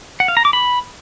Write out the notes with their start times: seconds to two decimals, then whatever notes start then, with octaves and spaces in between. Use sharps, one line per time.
0.20 F#5
0.28 F5
0.37 A#5
0.45 D6
0.53 B5